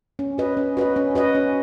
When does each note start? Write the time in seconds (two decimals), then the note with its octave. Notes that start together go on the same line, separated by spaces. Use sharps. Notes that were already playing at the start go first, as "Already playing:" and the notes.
0.19 C#4
0.38 F#4 B4 D#5
0.57 C#4
0.77 F#4 B4 D#5
0.96 C#4
1.15 F#4 B4 D#5
1.35 C#4